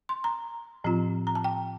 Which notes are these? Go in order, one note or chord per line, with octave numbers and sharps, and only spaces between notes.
C6
A#5
A2 F3 C4 F4
A#5
A5
G5